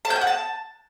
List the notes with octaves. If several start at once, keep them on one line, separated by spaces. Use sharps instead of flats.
A5
G6
G#5
F#5
A5